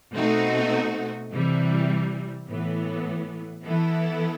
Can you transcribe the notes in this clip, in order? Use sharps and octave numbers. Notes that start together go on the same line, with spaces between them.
B2 A3 C4 D#4 F#4
C3 E3 G3
A2 E3 B3
E3 B3 E4 A4